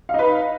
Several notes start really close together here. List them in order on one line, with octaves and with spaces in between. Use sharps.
F5 D#4 B4